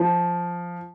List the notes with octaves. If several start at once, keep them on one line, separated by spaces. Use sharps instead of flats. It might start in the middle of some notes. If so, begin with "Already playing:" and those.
Already playing: F3